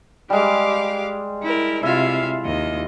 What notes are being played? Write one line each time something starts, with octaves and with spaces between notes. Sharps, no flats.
G3 G#3 G4 F5 D6
E4 A#4
C3 E4 F4 E5 F5
D#2 D#5